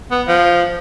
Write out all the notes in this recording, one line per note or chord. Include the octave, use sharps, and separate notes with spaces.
B3
F3